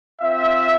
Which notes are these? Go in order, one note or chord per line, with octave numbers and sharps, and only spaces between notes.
C4 F4 E5